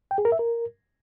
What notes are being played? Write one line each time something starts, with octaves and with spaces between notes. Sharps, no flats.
G5
G#4
A#4
E5
A#4